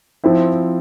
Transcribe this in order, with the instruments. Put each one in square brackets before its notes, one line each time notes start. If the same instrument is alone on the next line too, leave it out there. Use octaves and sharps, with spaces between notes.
[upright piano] F3 C4 E4